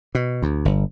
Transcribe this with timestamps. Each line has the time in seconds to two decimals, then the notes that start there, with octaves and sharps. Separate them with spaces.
0.15 B2
0.42 D2
0.65 G1